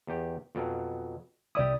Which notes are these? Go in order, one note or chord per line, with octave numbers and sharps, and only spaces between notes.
E2 G4
F2 B2 F#3
C2 E4 G4 D5 D#6